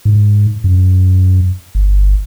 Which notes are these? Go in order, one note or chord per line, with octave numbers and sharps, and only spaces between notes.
G#2
F#2
G1